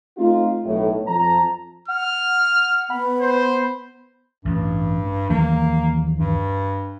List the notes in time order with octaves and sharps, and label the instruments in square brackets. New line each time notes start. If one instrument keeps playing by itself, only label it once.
[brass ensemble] A3 C4 D#4 F4
B1 A2
F2 A5 A#5
[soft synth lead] F#5 [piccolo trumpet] F6
[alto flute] B3 [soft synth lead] B5
[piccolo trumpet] C5
[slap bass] A1 [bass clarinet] G2
[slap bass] D#2 E3 F#3 [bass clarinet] A#3
[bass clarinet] G2